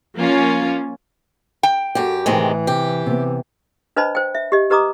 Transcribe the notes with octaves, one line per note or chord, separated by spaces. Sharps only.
F3 A#3 C#4 F4
G5
F#2 G4 A4 F#5
A2 C3 D#3 E3 G#3
C3 G4
C3 B3
D4 B4 C5 D#5 A5 B5
C5 G5
E5
G4 D#5
G4 B4 D#5 A#5 D6 D#6